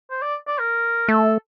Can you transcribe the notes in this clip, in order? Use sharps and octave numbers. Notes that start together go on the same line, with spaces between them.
C5
D5
D5
A#4
A3 A4